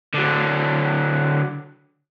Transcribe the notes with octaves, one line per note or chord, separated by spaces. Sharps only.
D3 F#3